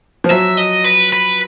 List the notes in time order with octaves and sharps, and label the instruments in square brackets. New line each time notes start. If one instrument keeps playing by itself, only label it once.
[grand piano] F3
[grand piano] F#3 [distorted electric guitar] E5
[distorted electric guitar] D#5
B4
B4